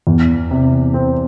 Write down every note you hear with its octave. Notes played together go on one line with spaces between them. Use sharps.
E2
C3
C4